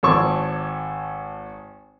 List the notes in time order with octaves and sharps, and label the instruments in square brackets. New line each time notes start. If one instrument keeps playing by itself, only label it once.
[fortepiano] G#1 A4 C#5 C#6 D6